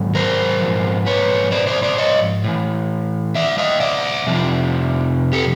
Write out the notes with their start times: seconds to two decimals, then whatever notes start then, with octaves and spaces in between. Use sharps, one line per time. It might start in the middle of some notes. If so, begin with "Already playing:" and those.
Already playing: G#2 D#3 F#3
0.15 A#4 C5
0.61 G#2 F3
1.06 B4 C#5
1.52 C5 D5
1.67 C5 D5
1.83 C5 D5
1.98 C#5 D#5
2.44 A2 E3
3.35 D5 E5
3.58 D#5 F5
3.80 D5 E5
4.27 F2 C3 F3
5.33 G4 A4